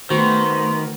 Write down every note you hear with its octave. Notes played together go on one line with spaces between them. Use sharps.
D#3 A3 B3 F#4 C5